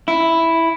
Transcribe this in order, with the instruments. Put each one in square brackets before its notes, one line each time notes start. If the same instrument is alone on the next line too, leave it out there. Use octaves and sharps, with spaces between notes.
[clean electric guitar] E4